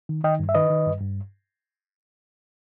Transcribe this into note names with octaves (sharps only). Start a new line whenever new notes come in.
D#3
D#3 D#5 G5
G2
E5
D#3 B4 D#5
D#3
G2
G2